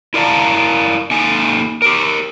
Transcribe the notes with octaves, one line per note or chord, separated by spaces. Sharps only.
E4 A#4 D5 F5 A5 A#5
A#3 D#4 A4 G#5
G4 A#4